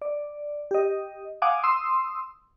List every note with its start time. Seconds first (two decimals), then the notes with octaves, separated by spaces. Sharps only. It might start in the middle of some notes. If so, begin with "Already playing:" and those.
0.02 D5
0.71 G4 D#5
1.42 F5 F#5 G#5 D6 D#6
1.63 C6 D#6 E6